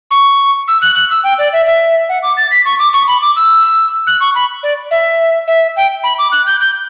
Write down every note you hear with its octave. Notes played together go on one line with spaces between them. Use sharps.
C#6
E6
F#6
F#6
E6
G5
D5
E5
E5
F#5
D6
A6
B6
C#6
D6
C#6
B5
D6
E6
F#6
C#6
B5
D5
E5
E5
G5
B5
D6
F#6
G6
G6